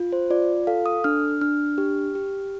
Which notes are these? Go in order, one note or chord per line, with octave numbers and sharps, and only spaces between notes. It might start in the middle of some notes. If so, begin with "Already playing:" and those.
Already playing: F4
C5
F4 D5
A4 F5
D#6
D4 F6
D4 F6
G4
G4